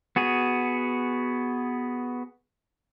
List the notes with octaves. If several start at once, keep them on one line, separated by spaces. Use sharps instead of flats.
B3 F#4 G#4